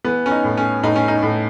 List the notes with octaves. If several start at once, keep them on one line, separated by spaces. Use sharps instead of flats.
E3 B3
C#4
D#4
A2
C#4
A2 D#4
C#4
D#4
A2